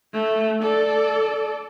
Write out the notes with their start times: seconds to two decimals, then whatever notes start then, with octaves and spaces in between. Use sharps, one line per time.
0.14 A3
0.62 A4 D5